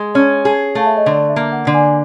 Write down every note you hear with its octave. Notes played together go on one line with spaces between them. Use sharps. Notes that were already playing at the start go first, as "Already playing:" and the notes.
Already playing: G#3
C#4 C#5
G#4
A3 F5
E5
D#5
D3 D5
E5
A#3
F#5
D3
G#5